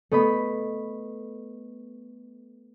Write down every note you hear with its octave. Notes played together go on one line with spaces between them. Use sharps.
A3 B3 D#5 B5